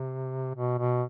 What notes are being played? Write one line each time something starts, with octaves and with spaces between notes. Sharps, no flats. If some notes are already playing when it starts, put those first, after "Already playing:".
Already playing: C3
B2
B2